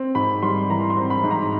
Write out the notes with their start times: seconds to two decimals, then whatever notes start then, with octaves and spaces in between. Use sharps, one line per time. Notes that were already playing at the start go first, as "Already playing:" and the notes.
Already playing: C4
0.15 G#2 B5
0.42 G3 C6
0.69 E3 A#5
0.90 C6
0.97 C4
1.10 B5
1.24 G#2
1.31 A#5